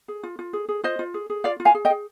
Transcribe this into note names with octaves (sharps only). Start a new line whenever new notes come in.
G#4
F4
F4
G#4
G#4
F4 C5 D#5
F4
G#4
G#4
F4 D5 F5
F4
F5 G#5
G#4
D#5 G5
G#4